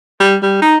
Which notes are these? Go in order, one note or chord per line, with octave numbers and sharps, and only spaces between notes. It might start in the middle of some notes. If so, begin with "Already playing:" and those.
G3
G3
D#4